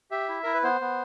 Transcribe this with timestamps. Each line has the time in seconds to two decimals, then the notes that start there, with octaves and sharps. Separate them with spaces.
0.11 G4 E5
0.28 E4
0.43 E4 A#4
0.54 B4
0.63 B3 C5
0.81 B3